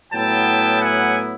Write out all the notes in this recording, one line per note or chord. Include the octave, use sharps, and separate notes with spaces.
A2 F#3 B3 E4 G5 A5
F#5 G#5